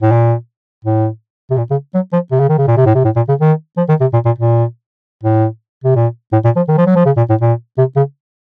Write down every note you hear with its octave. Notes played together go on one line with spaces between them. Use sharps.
A2
A#2
A2
C3
A#2
C#3
F#3
F3
C3
C#3
D#3
C#3
A#2
C3
A2
C3
A2
A#2
C#3
D#3
F3
D#3
C3
A#2
A#2
A#2
A2
C3
A#2
A2
A#2
F3
D#3
F3
F#3
F3
C#3
A#2
A2
A#2
C3
C#3